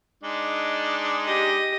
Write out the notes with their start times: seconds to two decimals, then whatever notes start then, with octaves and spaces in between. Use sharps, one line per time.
0.23 G#3 D4 D#4
1.25 G4 D#5